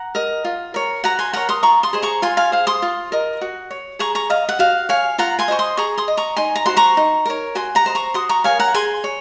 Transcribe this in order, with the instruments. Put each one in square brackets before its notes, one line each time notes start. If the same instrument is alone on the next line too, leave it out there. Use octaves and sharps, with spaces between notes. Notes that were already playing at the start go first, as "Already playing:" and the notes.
Already playing: [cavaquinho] F#5 A#5
A#4 D#5
F4
A#4 C#5
F#4 F#5 A#5
G#5 C6
A#4 C#5 F#5 A#5
C6 D#6
F4 A#5 C#6
C6 D#6
G#4 C5 D#5
A#5 C#6
F4 G#5 C6
F5 G#5
G#4 C5 F5
C6 D#6
F4
A#4 D#5
F#4
C#5
G#4 A#5 C#6
A#5 C#6
D#5 F5
F#5
F#4 F5
C#5 F5 G#5
F4 F#5 A#5
G#5 C6
C5 D#5 C#6
C6 D#6
G#4 A#5 C#6
C6 D#6
D#5
A#5 C#6
D#4 G#5 C6
A#5
F#4 C5 C6
A#5 C#6
D#4
A#4 C#5
F#4 G#5 C6
F#5 A#5
C5 D#5
A#5 C#6
F#4 C6 D#6
A#5 C#6
A#4 C#5 F5 G#5
F#5 A#5
G#4 G#5 C6
C#5